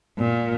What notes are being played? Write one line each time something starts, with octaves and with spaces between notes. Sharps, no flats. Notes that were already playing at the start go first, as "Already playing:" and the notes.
A#2